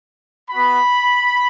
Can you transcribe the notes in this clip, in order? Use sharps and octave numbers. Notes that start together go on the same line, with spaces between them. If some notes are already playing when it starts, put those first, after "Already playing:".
B3 F#4 B5